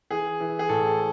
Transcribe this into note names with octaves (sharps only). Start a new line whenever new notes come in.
E3 G#4
E3
G#4
A2 A4